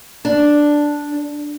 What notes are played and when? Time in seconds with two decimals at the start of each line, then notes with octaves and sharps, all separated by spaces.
0.25 D4